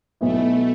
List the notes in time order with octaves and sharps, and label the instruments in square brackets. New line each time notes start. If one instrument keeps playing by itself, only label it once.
[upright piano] B1 B2 B3 E4 [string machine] A3